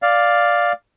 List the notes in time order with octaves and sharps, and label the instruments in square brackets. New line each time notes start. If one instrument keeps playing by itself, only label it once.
[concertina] D5 F5